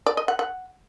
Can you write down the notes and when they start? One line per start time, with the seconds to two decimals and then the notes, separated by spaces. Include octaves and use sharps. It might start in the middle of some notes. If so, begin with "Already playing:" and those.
0.06 D5
0.17 D#5
0.28 F#5
0.39 F#5